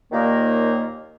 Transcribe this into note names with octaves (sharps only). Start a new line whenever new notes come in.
D#2 A#2 D#3 A#3